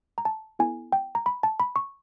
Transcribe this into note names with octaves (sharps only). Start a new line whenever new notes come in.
A#5
A5
B3 E4 A4 G#5
G5
A#5
B5
A5
B5
C#6